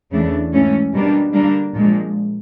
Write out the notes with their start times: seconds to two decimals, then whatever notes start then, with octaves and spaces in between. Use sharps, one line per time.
0.11 E2 C#3 E3 A3 D4
0.52 G#2 E3 A3 C#4
0.93 B2 G3 A#3 D4
1.33 D3 G3 A#3 D4
1.74 A#2 F3 G#3